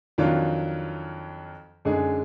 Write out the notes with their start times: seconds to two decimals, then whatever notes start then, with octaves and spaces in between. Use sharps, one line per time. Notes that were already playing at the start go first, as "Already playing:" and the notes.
0.18 F2 D#3 F#3 D4 F4
1.85 F#2 D3 G#3 D#4 G#4